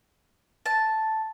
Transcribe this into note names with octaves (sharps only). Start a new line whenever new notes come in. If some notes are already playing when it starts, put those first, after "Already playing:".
A5